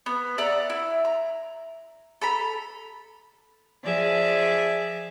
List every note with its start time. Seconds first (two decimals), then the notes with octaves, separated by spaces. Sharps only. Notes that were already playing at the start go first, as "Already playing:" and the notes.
0.06 B3
0.38 D5 E5 F#5 A#5
0.70 E4
1.05 A#5
2.22 A4 A#5 B5
3.84 F3 G#4 D5 E5